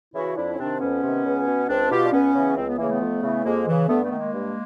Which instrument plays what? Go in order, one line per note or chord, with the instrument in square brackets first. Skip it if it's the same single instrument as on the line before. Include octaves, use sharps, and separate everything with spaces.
[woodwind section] C#3 E3 E4 F#4
F2 D4 E4
C#4
C3 D#3 C4 D4
F2 B3 C#4
C3 D#3
C#2
B2
C#2 C4 D4
B2 F4 G4
D4
C#2 B3 C#4
C#3 E3
C#2 C4
B3
C#3 E3 A#3
A3 B3
F2
C#3 E3
F2 G#3 A#3
C#3 E3
G2 A3 B3
A3 B3
D#3
G#3 A#3
G2